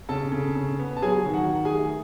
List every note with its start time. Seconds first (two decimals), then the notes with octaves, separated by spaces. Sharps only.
0.09 C#3 A4 A5
0.32 C#3
0.55 C#3
0.79 B3
0.97 A5
1.02 F#3 G#4 G#5
1.26 D#3
1.33 F#4 F#5
1.49 D#3
1.65 G#4 G#5
1.73 A3